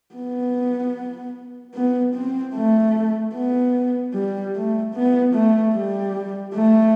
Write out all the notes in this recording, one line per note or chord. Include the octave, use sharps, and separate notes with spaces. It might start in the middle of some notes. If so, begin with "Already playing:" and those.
B3
B3
C4
A3
B3
G3
A3
B3
A3
G3
A3